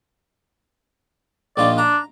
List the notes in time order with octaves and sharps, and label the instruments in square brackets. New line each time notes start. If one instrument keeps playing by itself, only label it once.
[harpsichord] A#1 D#3 F4 [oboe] D5
[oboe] D4 [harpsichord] A#5